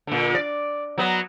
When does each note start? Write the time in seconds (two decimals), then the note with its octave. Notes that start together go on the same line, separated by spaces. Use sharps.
0.07 A#2 D3
0.35 D5
0.98 F#3 B3